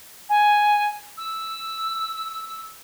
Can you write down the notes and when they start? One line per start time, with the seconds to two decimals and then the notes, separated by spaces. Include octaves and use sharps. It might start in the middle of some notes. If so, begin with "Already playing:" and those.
0.29 G#5
1.18 E6